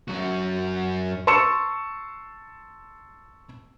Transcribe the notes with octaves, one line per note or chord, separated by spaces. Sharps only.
F#2 F#4
A5 C6 C#6 E6 C#7 E7